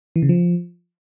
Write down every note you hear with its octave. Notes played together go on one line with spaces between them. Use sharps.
E3
C#3
F3